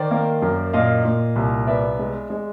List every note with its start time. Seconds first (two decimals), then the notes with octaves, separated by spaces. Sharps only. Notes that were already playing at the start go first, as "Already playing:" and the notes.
Already playing: D#3 C5 D5
0.11 A#3
0.42 F#2
0.73 A#2 D#5 F5
1.05 A#2
1.36 C2
1.67 B3 D5 E5
1.99 G#3
2.30 G#3